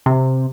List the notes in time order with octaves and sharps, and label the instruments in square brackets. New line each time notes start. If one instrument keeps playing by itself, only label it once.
[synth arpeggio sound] C3